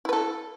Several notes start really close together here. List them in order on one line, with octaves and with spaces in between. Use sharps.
E4 B4 A4